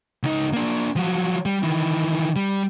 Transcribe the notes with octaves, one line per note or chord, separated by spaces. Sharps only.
C#2 D#4
A#3 D4
F3 F#3
G3
D#3 E3
G3